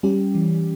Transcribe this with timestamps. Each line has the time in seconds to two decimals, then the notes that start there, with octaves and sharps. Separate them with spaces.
0.03 G3 C#4 G4
0.35 E3